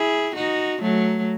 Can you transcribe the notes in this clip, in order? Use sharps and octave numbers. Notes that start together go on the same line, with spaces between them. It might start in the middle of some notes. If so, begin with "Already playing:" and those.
Already playing: E4 G#4
D#4 F#4
F#3 A3